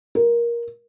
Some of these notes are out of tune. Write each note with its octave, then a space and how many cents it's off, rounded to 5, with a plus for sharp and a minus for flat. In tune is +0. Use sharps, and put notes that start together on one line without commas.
A#4 +15